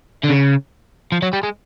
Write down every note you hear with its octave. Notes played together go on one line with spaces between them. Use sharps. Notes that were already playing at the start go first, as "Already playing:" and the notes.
D3
C#3
F3
F#3
G3
G#3